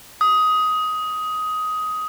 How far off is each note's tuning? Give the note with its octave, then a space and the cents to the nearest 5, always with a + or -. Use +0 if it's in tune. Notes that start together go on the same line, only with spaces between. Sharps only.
D#6 +15